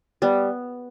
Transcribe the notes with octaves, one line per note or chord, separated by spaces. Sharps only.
G3 B3